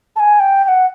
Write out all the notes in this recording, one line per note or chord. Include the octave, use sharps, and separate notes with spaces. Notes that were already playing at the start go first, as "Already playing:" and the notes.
A5
G#5
G5
G5
F#5